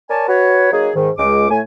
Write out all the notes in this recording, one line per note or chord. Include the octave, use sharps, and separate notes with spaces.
A#4 C#5 D5 G#5 A5
F#4 B4 C#5
F#3 A#3 D#4 G#4
G#2 D#3
C#2 G#3 D6
A2 A3 G#5